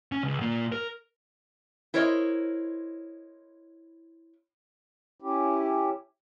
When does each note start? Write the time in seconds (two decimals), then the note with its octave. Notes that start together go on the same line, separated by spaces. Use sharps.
0.12 C#4
0.24 C#2
0.40 A#2 A#3
0.72 A#4
1.94 E4 A#4 C5 C#5 D#5
5.20 C#4 E4 G4